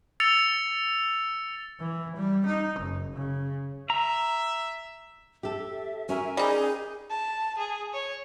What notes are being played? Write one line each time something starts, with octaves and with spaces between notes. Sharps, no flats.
E6 A6 C#7 F7
E3
G3
D#4
F#1
C#3
E5 A#5
G4 A4 E5
C#4 F#4 A#4 E5 G#5
G3 D#4 G#4
A5
G#4
C#5